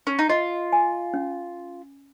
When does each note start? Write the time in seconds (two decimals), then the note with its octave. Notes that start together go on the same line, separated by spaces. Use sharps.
0.07 C#4
0.19 D#4
0.30 F4 D#5
0.73 G#5
1.14 C#4